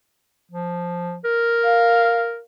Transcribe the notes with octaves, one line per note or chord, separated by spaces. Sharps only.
F3
A#4
F5